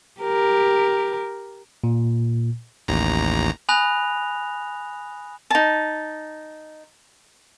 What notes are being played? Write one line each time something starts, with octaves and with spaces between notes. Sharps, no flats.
G4 A#4
A#2
A1 D#2 A#5
G#5 B5 D#6 F#6 A#6 F7
D#4 A5